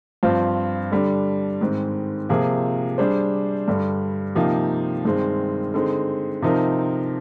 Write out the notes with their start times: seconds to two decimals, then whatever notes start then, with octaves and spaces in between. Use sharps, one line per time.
0.23 G2 F3 C4 F4 C5
0.91 D3 G3 D4
1.61 G#2 D#3 G#3 C4
2.29 C3 F3 A#3 F4 G#4
2.98 G3 D4 G#4 C5
3.68 G2 D3 G3
4.35 C3 F3 A#3 D#4 G4
5.04 G2 D#3 G#3 C4
5.74 D3 G#3 C4 D#4
6.42 C3 F3 C4 D#4 A#4